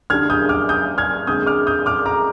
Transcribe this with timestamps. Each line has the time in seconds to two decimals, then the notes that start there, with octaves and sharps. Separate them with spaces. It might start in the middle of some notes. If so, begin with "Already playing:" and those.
0.10 D3 G3 D4 F6 G#6
0.30 D#6 G6
0.49 D6 F6
0.69 D#6 G6
0.98 F6 G#6
1.27 D3 G#3 C4 D#6 G6
1.46 D6 F6
1.67 D#6 G6
1.86 D6 F6
2.05 A#5 D6